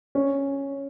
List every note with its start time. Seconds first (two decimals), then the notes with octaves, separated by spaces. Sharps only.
0.15 C#4